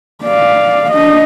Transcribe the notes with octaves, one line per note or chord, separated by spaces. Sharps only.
D5 F5
D4 D#5